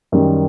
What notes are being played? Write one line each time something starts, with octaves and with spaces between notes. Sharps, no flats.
F#2 D#3 G3